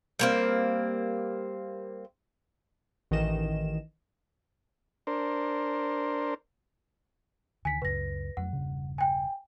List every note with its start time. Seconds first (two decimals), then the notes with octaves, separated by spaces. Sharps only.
0.19 G3 A#3 C4
3.11 A1 D#3 E3 D#5 E7
5.07 D4 A#4 C5
7.65 D2 D3 D#3 G#5 B6
7.82 C#2 F#2 C#3 B4 A#6
8.37 F2 F#3 A3 F#5
8.53 E1 G2 C#3
8.98 G5 G#5